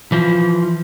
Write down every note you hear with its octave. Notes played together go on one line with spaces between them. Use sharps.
E3 F3